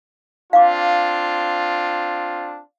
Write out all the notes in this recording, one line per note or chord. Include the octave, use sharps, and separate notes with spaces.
C4 D4 F4 F5 D6